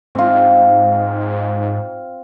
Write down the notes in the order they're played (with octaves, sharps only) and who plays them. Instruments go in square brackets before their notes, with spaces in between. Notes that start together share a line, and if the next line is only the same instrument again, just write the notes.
[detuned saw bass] G#2 [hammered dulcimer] C4 F4